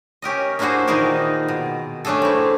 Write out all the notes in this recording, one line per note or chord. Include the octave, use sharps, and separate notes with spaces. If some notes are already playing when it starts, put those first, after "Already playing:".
C#4 G4 A#4 D#5
A#3 D4 E4 F#4 G#4 C5
A#2 D#3 E3 D#4 G#4 A#4
B2
A3 C#4 D4 G#4 A4
C4 E4